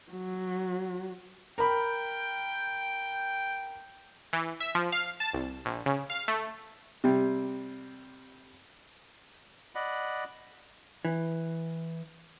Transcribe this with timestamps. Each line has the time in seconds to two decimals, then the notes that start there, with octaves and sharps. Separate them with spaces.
0.11 F#3
1.58 A#4 G5 B5
4.33 E3
4.60 E5
4.75 F3
4.92 F5
5.20 A5
5.33 C2
5.65 A#1
5.86 C#3
6.10 F5
6.28 A3
7.04 C3 G3
9.75 D5 D#5 F#5 B5
11.05 E3